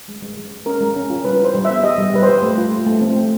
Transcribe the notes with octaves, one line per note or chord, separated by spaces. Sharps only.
G#3
G#3
G#3
G#3
C#4 A#4
G#3
C#4
F4
G3 B4
E4 C5
G3
E5
B3
G4 D#5
G3
G3 B4
C5
G4
A3
F4
A3
A3
C4
A3